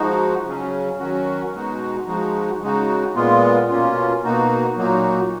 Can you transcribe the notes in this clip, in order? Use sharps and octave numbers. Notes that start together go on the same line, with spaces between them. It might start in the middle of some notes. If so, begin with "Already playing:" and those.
Already playing: F3 G#3 D#4 F#4
C#3 F#3 C#4
D#3 F#3 C#4 F#4
B2 G#3 D#4 F#4
F3 G#3 D#4 F#4
C#3 G#3 D#4 F#4
A#2 G#3 B3 F4
B2 A#3 C#4 F4
B2 A#3 D#4 F#4
A#2 F#3 A#3 D#4 F#4